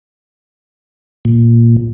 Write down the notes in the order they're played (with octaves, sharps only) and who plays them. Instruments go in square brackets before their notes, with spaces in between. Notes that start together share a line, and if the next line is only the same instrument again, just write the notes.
[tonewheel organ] A#2